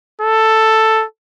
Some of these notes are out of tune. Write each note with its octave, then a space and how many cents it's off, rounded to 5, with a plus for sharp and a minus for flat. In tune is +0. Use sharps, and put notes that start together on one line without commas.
A4 +5